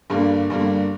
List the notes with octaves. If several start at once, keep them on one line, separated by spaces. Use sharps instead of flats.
G2 D3 G3 A#3
G2 D3 G3 A#3